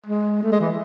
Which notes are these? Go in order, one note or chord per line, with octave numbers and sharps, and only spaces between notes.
G#3
A3
G#3
E3